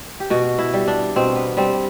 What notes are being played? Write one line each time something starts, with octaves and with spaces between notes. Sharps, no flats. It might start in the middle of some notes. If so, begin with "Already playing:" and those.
G4
B2 F#4
E4
G3
D4
B2 C4
B3
G3 C4